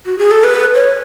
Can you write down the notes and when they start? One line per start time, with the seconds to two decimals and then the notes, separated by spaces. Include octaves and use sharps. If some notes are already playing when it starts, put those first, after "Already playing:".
0.06 F#4
0.18 G#4
0.31 A4
0.44 B4
0.75 C#5